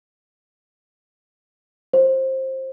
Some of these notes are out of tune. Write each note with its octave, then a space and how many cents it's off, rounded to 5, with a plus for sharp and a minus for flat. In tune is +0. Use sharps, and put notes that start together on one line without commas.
F4 +20 C5 +20